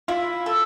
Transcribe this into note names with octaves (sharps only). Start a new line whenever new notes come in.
E4 F4
A4